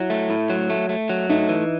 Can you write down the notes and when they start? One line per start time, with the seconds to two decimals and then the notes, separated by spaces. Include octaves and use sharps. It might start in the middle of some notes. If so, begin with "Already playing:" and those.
Already playing: F#3 E4
0.10 A3
0.30 A2
0.50 F#3
0.70 A3
0.89 A3
1.09 F#3
1.29 A3 D#4
1.49 E3